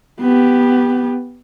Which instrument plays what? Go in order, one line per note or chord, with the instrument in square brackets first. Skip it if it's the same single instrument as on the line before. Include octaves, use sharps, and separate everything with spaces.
[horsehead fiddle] B3 G4